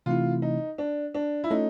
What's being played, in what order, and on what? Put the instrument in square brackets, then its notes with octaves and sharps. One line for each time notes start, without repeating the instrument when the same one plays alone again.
[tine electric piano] C3 E3 A3 C4 E4 [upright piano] F4
[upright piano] D#4
D4
D4
E4
[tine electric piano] A3 C#4 F4 A4 C#5 [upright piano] D#4